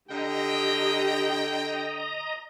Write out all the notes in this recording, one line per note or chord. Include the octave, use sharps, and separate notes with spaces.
D3 G4 D#5 G5 A#5